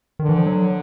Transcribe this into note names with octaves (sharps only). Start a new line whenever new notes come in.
D#3
D3
E3
F3
F#3